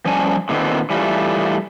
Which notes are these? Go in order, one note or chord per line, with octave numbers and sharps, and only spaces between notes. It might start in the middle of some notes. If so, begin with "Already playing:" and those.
F3 G3 C#4 G#5 A5
A#2 D3 D#3 B3 C4
E3 G3 A3 F4